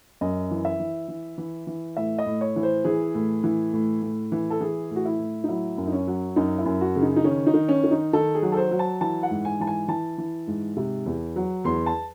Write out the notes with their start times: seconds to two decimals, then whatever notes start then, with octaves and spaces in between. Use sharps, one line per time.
0.21 F#2 D#5
0.51 E3
0.65 E5
0.80 E3
1.08 E3
1.38 E3
1.67 E3
1.97 A2 E5
2.18 D#5
2.26 A2
2.41 C#5
2.56 E3
2.63 C5
2.84 E3 G#4
3.15 A2
3.44 E3
3.73 A2
4.02 A2
4.32 E3
4.50 A4
4.60 E3 G#4
4.91 A2 F#4
5.05 E4
5.19 A2
5.44 D#4
5.49 F#3 E4
5.78 F#2
5.87 D#4
5.92 C#4
6.07 F#3
6.36 F#2 D#4
6.58 E4
6.66 F#2
6.81 F#4
6.96 C#3
7.02 D#4
7.16 D#4
7.24 D#3 C#4
7.47 D#4
7.54 D#3
7.69 C#4
7.84 D#3
7.91 D#4
8.13 D#3 A4
8.35 G#4
8.42 F#3
8.52 A4
8.57 C5
8.71 F#3
8.79 A5
9.01 E3 A5
9.23 F#5
9.31 G#2
9.45 G#5
9.60 E3 A5
9.67 G#5
9.88 E3 A5
10.18 E3
10.47 G#2
10.77 C3
11.06 E2
11.36 F#3
11.64 E2 C6
11.86 A5